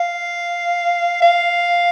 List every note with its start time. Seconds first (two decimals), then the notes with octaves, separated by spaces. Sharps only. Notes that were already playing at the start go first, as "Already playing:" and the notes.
Already playing: F5
1.22 F5